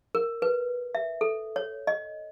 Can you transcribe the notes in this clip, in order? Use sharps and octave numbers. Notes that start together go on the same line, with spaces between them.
A#4
B4
E5
A4
C#5
D#5